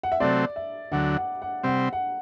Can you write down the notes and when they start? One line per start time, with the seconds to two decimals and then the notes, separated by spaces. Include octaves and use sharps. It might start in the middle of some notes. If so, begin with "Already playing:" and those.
0.03 F#5
0.12 E5
0.20 C3 F#3 A3 C4 D5
0.56 E5
0.92 D2 D3 F#3 F#5
1.18 F#5
1.42 F#5
1.64 C3 G3 C4 F#5
1.93 F#5